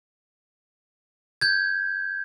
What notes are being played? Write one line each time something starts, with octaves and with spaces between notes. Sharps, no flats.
G6 G#6